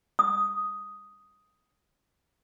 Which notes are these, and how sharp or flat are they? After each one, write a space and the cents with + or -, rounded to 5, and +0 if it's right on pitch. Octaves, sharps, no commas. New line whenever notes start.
D#6 +5